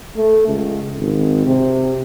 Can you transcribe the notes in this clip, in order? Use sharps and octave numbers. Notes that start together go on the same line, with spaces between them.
A3
C#2
G#1
C3